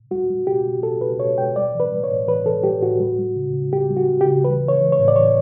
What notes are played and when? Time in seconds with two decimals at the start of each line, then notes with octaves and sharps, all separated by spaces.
0.11 G3 F#4
0.30 G3
0.47 B2 G4
0.66 B2
0.83 B2 A4
1.01 B2 B4
1.19 B2 C#5
1.38 B2 G5
1.56 G3 D5
1.74 E3
1.80 B4
1.92 G3
2.04 C#5
2.10 A2
2.28 E3 B4
2.45 E3 A4
2.63 G3 G4
2.82 A2 F#4
3.00 G3
3.19 G3
3.36 C#3
3.54 C#3
3.72 G3 G4
3.90 G3
3.97 F#4
4.08 G3
4.21 C#3 G4
4.44 E3 B4
4.62 E3
4.68 C#5
4.81 E3
4.92 C#5
4.99 A2
5.08 D5
5.16 E3 C#5